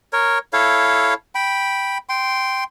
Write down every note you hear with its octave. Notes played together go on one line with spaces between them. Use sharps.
A#4 C#5
E4 A4 C#5 F5
G5 B5
G5 C6